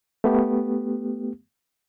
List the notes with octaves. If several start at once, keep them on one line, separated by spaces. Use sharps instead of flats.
A3 B3 G4